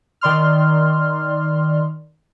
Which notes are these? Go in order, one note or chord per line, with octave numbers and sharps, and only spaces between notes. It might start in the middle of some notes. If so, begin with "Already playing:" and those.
D#3 D5 C6 F6